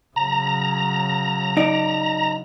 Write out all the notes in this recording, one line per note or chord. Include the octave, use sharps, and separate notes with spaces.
C#3 F#3 A#5
D#4 D5